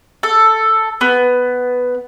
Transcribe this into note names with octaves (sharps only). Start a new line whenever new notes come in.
A4
B3